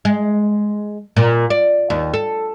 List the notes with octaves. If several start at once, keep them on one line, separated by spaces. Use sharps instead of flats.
G#3
A#2
D5
D#2
A4